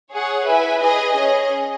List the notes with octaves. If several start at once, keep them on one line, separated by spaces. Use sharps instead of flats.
G#4 C#5 F#5
E4 B4 E5 G#5
G#4 B4 D#5 G#5
C#4 G#4 D#5